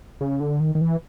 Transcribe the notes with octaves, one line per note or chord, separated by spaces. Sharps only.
C#3
D3
D#3
D#3
E3